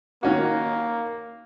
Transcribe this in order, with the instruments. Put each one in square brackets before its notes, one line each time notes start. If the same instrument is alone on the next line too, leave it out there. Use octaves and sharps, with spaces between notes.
[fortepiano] D#3 C#4 F#4 [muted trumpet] A#3